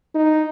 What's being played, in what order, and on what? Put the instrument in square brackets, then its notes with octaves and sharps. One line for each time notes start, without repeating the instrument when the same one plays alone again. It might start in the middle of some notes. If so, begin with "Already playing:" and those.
[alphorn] D#4